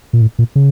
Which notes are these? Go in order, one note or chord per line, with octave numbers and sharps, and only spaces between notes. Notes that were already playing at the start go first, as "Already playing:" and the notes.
A#2
A2
A#2
C#3